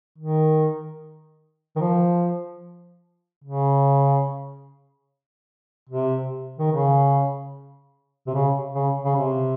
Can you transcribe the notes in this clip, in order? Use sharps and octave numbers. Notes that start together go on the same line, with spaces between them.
D#3
D#3
F3
C#3
C3
D#3
C#3
C3
C#3
C#3
C#3
C3